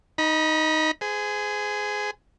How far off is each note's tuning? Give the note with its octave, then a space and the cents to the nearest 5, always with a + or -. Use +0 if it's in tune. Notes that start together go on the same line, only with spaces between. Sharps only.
D#4 +0 B5 -35
G#4 +5 C5 -35